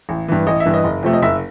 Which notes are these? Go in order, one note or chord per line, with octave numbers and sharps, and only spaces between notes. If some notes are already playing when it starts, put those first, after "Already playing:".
A1
G2 E3
A1 D#5
E5
G2 E3
D#5
F#1
F2 C3 F3 A3
D#5
F#1 E5